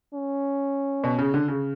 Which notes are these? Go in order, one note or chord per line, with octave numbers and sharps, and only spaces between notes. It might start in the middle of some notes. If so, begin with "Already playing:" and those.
C#4
B2
C#3
D3
C#3